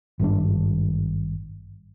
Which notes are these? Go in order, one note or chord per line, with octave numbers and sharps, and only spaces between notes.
G#1 G2 D4